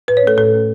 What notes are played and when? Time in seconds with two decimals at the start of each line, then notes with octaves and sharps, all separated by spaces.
0.08 A2 B4
0.17 C#5
0.23 A3 C#4 A4
0.37 A2 A4
0.53 A3 C#4